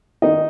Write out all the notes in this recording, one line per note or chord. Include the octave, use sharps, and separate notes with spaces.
D#3 D#4 D#5